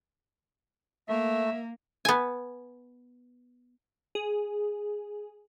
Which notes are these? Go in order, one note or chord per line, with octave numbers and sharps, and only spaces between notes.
A3 A#3 E5
B3 G#5
G#4